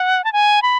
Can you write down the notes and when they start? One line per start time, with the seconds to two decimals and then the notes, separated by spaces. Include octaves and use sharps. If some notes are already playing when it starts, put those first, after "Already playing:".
Already playing: F#5
0.24 A5
0.33 G#5
0.62 B5